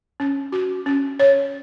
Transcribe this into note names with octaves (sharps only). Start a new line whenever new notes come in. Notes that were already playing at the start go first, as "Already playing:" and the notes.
C#4
F#4
C#4
C#5